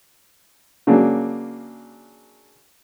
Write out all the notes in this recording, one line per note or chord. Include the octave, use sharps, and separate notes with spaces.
C#3 F#3 A#3 D4